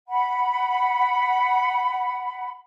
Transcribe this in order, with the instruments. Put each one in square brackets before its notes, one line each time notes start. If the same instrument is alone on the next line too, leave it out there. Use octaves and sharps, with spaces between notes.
[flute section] F#5 B5